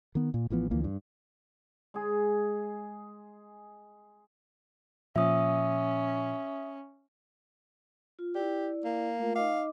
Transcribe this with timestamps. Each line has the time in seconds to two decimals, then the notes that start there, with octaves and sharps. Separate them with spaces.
0.15 D#3 B3
0.34 A#2
0.50 A1 E3 F3 B3
0.71 D2 E3 F3 A#3
0.84 G2
1.94 G#3 G#4
5.16 A#2 F3 C#4 E5 D#6
8.19 F4
8.35 E4 G4 D5
8.84 A#3
9.19 A3 F4 A#4
9.35 D#4 D#5 F5 D6